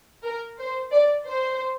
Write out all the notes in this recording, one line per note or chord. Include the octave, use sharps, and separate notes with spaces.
A#4
C5
D5
C5